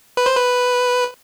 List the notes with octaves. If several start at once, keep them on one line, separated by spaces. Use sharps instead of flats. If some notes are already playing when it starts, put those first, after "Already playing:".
B4
C5
B4